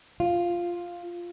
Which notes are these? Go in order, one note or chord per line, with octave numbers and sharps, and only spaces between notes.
F4